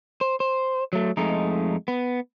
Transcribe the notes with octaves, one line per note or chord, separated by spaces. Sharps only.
C5
C5
F#3 A3
F2 G#3 A3 D#4
B3